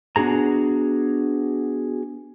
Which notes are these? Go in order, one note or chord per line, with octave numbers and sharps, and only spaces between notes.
B3 D4 F#4 G#4 A#5